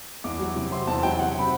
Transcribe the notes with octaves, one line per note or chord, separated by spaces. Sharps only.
E2 D6
F#3
C3
C4 C6
E2 A5
F#3 G5
C3 F#5
C4 B5